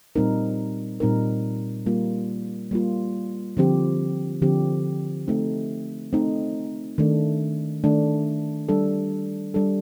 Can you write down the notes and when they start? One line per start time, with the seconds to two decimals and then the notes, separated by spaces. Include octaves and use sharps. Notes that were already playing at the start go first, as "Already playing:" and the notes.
0.16 A#2 G3 C4 D#4 A#4
1.00 A#2 G3 C4 D#4 A#4
1.86 G3 A#3 F4
2.71 G3 A#3 F4
3.57 D3 F3 C4 G4
4.42 D3 F3 C4 G4
5.28 A3 C4 D#4
6.13 A3 C4 D#4
6.98 D#3 A3 D4
7.84 D#3 A3 D4
8.69 G3 D4 A4
9.54 G3 D4 A4